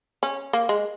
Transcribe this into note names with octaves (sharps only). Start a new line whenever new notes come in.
C#4
A#3
G#3